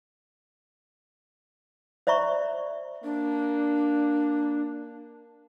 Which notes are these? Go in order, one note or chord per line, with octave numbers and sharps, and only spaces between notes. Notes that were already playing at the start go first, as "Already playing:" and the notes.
C5 D5 E5 A#5 C#6
A#3 D4